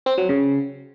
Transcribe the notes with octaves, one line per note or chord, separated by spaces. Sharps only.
C4
F#3
C#3